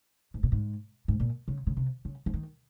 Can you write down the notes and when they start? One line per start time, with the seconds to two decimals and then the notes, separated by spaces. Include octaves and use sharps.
0.34 G#2
0.43 A#2
0.52 G#2
1.08 G#2
1.20 A#2
1.48 C#3
1.67 C#3
1.77 C3
2.05 C#3
2.26 F3
2.34 D#3